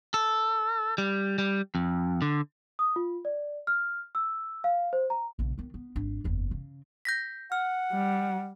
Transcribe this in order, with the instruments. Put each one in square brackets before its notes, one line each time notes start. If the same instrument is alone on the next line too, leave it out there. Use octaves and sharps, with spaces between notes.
[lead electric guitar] A4
G3
G3
F2
D3
[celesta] D#6
F4
D5
F6
E6
F5
C5
A#5
[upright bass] A#1 C#3
D#3 B3
B3
G#1 D4
F#1 E2
C#3
[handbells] G6 A#6 B6
[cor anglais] F#5 [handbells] F6
[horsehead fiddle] G3